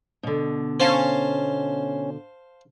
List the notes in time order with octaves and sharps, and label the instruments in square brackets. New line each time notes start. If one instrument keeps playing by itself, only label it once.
[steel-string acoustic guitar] B2 D3
[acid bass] C#4 [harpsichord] C5 F5 A5